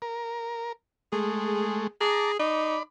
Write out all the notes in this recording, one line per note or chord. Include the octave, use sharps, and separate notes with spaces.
A#4
G#3 A3 G#4
G#4 A5 A#5 D6
D#4 D5 B5